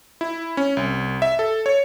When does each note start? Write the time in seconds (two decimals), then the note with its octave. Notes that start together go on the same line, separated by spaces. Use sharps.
0.21 E4
0.57 C#4
0.77 C2
1.22 E5
1.39 A4
1.66 C#5